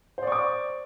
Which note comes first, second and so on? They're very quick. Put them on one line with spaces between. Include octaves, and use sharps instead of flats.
C5 D5 C#6 D6